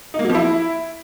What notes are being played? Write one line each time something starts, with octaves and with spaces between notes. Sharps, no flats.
D#4
A#3
F#3
F3
E4